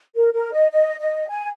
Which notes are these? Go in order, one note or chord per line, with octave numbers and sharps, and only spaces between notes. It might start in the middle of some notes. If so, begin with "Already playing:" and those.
A#4
A#4
D#5
D#5
D#5
G#5